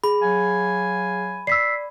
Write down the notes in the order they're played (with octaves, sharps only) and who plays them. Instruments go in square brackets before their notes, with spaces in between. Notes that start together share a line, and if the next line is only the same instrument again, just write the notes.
[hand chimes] G#4 [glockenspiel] B5
[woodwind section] F#3 F5 G#5
[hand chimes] D5 [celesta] E6 B6 C7